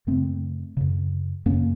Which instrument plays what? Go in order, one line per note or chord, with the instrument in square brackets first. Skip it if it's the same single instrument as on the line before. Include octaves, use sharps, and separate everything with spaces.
[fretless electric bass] F#2 C#3 A3 C4
F#2 C#3
F#2 C#3 A#3 C#4